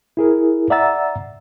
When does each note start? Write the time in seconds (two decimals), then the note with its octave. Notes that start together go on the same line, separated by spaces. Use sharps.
0.17 E4 G#4 A#4
0.70 D5 E5 F#5 A#5 E6 A6